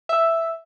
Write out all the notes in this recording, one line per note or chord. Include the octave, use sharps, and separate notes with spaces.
E5